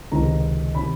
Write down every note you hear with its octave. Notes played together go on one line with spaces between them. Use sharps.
C#2 C3 D#3 A#5
C3 D#3 B5